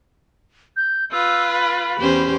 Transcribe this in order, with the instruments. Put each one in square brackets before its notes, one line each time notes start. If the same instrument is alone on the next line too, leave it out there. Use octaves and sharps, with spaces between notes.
[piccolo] G6
[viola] F4 B4 [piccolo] E6
[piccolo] B5
[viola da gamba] E2 C#4 C5 [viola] G4